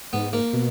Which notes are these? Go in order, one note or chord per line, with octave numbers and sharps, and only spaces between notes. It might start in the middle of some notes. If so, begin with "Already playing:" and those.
G#2 B3
A#3
B2